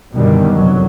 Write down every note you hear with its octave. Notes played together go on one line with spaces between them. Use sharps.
F#2 B2 D3 D#3 G3
F1 F#3